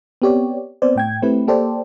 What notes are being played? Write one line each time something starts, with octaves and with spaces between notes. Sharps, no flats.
B3 C4 G4 C#5 D5
B3 C4 C5 D5
A2 G5 G#6
A3 C4 E4 G4 B4
A#3 G4 A4 C5 D5